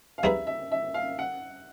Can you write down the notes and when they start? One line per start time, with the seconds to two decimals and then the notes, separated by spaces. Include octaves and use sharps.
0.18 F5
0.23 G3 C4 D#4 G#4 B4 E5
0.47 E5
0.72 E5
0.94 F5
1.19 F#5